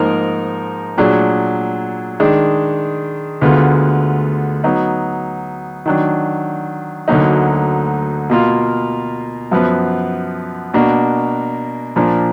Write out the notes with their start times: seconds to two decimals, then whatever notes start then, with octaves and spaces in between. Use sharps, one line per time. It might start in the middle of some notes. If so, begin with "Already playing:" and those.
Already playing: G#2 F3 A#3 D#4 A#4
0.98 A#2 F#3 D4 G#4 D5
2.20 D#3 G#3 D4
3.41 D2 D3 G#3 B3 F4
4.64 F#3 B3 D#4
5.86 D#3 F#3 D4
7.08 D2 D3 F#3 A#3 D#4
8.29 B2 A#3 F4
9.51 F#2 F3 B3
10.74 B2 A#3 D4 F#4
11.96 A#2 F3 A#3 D4